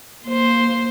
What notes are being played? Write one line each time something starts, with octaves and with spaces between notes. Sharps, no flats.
A#3 C5